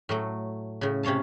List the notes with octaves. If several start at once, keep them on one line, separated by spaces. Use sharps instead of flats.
A2 F#3 A3
A2 C#3
C3 C#4 C#5 F5 A5